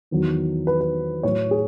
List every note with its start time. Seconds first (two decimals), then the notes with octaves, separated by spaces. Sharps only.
0.11 E2 D#3 F#3
0.67 B4
0.81 B4
1.23 A2 F#3 C#5
1.51 G#4